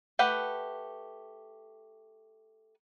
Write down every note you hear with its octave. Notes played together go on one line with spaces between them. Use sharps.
A3 G4 B4 F#5